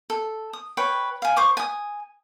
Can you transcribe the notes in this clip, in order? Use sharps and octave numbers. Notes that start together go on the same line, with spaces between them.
A4
D#6
B4 C#5 G5
F5 G#5
C5 C#6 D6
G#5 D#6